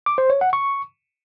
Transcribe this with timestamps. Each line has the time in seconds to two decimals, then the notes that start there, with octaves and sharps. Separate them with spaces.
0.06 D6
0.18 C5
0.30 C#5
0.41 F#5
0.53 C#6